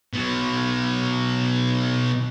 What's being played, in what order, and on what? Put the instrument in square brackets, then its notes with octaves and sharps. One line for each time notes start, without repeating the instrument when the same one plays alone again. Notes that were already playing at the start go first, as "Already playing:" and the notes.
[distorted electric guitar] B2 F#3